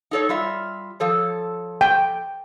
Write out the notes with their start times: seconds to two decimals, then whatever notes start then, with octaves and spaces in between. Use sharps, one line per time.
0.11 D#4 A4 C#5
0.29 G3 F4 E5
1.00 F3 A4 C#5
1.81 G5